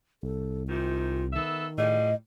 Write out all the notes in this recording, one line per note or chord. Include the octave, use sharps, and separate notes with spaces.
C2 A4
G#2 C3 D#3 F4
D#3 B3 A4 E5
A2 F3 G3 G#4 D#5